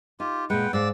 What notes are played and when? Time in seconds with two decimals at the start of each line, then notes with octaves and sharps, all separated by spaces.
0.20 D#4 F4 G4
0.50 A#2 G#3 B4 F#5 G5
0.73 G#2 D5 F5 E6